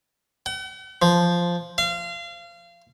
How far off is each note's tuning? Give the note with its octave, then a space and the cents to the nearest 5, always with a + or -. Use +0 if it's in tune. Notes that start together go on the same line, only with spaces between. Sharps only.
F#5 +45
F3 -5
F5 -30